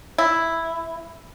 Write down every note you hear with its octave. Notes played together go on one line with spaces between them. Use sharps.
E4